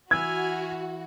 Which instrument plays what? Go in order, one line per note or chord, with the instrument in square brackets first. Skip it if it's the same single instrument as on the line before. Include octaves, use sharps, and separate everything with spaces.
[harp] E3 E6 [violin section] F#4 [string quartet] G#5 B5 F6 [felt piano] G#6